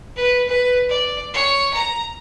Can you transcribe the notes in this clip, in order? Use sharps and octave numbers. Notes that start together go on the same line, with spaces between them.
B4
B4
D5
C#5
A#5